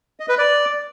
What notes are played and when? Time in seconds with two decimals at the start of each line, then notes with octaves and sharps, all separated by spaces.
0.20 D#5
0.29 B4
0.38 D5